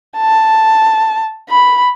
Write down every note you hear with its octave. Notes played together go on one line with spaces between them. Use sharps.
A5
B5